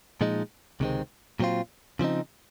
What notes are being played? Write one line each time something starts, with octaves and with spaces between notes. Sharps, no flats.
A#2 F3 G#3 D#4
C#2 C3 D#3 G#3 C4
A#2 F#3 C4 F4
C#3 F3 C4 D#4